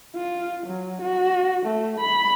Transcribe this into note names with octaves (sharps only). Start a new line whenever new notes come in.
F4
F#3
F#4
A3
B5